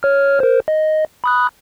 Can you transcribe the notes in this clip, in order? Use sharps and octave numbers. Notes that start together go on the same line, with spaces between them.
C#5 F6
A#4 C5
D#5
B5 D#6 F#6